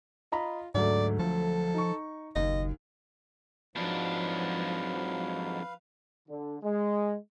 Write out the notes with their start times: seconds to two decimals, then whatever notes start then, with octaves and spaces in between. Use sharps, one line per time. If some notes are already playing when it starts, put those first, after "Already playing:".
0.32 F4 D#5 A#5 B5
0.75 D2 G#2 F#3 A3 D5
1.19 F3 A4
1.74 D#4 C#6
2.36 F#1 D#2 D#5
3.76 F2 G#2 F3 F#3 D4 B4 F5
6.29 D3
6.63 G#3